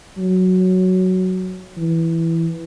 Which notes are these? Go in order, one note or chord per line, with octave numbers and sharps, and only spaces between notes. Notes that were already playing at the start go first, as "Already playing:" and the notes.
F#3
E3